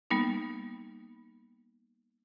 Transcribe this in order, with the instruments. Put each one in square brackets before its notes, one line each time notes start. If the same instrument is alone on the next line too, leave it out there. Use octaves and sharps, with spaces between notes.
[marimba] G3 A#3 B3 D#4